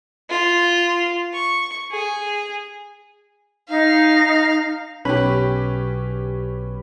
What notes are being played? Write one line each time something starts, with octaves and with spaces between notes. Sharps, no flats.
F4
C#6
G#4
D#4 F5
B1 C#4 G4 B4 B5